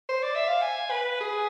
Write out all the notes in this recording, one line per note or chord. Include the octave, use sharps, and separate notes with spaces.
C5
D5
E5
F5
G#5
B4
G#4